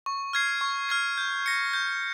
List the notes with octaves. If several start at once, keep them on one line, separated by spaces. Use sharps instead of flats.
C#6
F6 G#6 C7
C#6
F6 G#6 C7
G6
A#6 C#7
G6